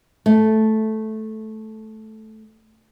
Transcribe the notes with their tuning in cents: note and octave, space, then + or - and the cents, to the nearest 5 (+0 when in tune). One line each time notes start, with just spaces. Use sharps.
A3 -10